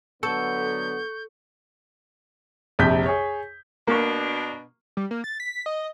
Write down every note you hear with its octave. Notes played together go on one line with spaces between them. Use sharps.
D3 F#3 B3 A4 C#6 G6 C#7
A#1 F2 C3 G6 B6
G#4 C#5
B2 A#3 D4 C#6
G3
A#3
A6
B6
D#5